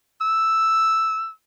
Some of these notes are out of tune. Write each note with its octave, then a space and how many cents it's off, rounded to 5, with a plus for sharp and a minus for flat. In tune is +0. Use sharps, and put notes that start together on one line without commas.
E6 +0